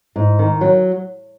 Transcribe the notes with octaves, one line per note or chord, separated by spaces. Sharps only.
G#2
D#3
F#3